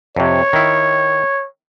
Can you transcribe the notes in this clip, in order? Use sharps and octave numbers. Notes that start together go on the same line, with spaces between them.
F2 C3 C#5
D#3 E4